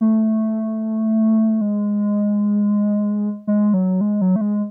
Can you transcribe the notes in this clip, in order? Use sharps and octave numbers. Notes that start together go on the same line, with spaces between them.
A3
G#3
G#3
F#3
G#3
F#3
A3
G#3